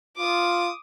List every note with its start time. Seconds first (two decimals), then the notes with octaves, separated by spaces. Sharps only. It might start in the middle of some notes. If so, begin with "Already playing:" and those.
0.17 F4 D6 D#6